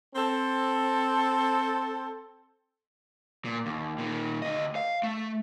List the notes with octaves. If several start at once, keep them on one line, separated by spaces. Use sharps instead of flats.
C4 A4
A#2
D#2
A#2 D#3
D2 D#5
F5
A3